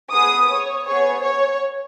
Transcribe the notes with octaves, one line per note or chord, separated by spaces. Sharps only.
B3 G#4 D#6
C#5
B3 G#4 C#5
C#5